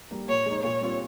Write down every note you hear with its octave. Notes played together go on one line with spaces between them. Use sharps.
G3 A#3
A#2 C#5
G#3 D#4
A#2 C#5
G3 C4 F4